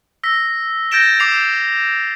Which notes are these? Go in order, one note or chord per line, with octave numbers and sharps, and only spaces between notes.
E6 A#6 B6
G6 A6 A#6 D7 E7 G7
D6 C7 F7